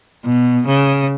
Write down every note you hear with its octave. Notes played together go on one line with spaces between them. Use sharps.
B2
C#3